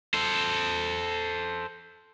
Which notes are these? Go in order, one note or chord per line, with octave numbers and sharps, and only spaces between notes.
A4 C5